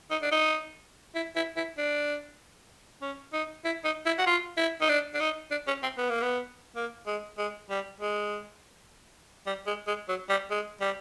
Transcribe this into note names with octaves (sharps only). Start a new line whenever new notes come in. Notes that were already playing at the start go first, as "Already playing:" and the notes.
D#4
D4
D#4
E4
E4
E4
D4
C#4
D#4
E4
D#4
E4
F#4
F4
E4
D#4
D4
D4
D#4
D4
C#4
C4
B3
A#3
B3
A#3
G#3
G#3
G3
G#3
G3
G#3
G#3
F#3
G3
G#3
G3